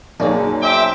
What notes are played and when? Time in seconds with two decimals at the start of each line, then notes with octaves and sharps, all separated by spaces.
0.20 B1 F#2 A#3 G#4 C#5 D5
0.62 C5 E5 G5 D6